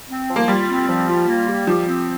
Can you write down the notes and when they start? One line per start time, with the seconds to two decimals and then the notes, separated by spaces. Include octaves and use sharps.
0.08 C4
0.28 F3
0.36 A#3
0.48 G3 F4
0.68 C4
0.87 F3
1.08 F4
1.27 A#3
1.47 G3
1.67 F3 G4
1.87 C4